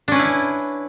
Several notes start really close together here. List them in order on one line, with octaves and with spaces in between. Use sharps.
D4 C#4 B4 E4